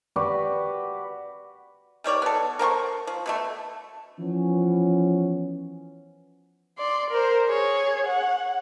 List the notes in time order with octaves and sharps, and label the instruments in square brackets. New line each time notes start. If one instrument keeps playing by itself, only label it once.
[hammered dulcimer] F#4 G4 B4 D5
[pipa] D#3 G3 C#5 D5
B3 A4
A#4 C5 G5 C#6
F3
B2 D3 A3
[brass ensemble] E3 F3 B3 C#4
[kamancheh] D5 C6
A#4 C5
G#4 C#5
F#5